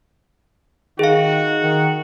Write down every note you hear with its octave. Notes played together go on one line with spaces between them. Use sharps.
D#3 D#4 F#4 G#4 F5
D#3